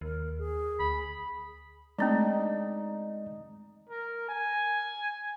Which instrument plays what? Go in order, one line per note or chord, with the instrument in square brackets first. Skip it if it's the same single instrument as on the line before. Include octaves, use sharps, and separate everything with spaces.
[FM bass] D#2 [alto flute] A#4
[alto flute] G#4
[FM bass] D2 [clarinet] B5
[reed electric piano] G#3 D5 A#5 [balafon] A3 C4 D4 [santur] D#4 E6
[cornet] A#4
G#5